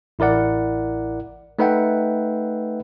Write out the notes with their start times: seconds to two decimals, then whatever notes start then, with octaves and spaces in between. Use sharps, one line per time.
0.19 A1 E4 A#4 D5 F#5
1.59 A3 D#4 B4 E5 F#5 G5